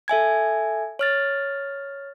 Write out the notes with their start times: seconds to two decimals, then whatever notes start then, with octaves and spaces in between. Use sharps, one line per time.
0.08 A4 E5 G#5 G#6
0.99 C#5 F6 A6